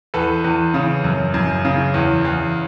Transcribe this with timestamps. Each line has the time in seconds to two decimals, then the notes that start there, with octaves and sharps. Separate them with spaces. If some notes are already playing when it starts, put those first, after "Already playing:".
0.14 E2 A4 B4
0.44 E2
0.74 C#3
1.04 F#2
1.34 F#2
1.65 C#3
1.94 E2
2.25 E2